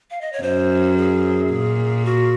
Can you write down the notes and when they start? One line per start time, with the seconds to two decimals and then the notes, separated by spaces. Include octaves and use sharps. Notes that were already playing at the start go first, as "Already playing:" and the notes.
0.11 F5
0.21 D#5
0.33 C#5
0.43 F#2 C5
0.97 G#4
1.51 A#2
2.05 F#4